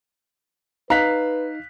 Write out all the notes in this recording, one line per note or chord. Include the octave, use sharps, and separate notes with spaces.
D#4 B4 F5 A#5 F#6 B6